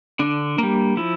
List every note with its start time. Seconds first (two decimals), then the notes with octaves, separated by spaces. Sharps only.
0.19 D3 D4
0.58 G3 A#3
0.97 F3 E4